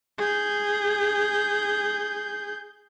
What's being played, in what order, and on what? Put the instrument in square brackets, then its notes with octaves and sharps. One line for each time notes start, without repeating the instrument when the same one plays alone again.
[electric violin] G#4 G6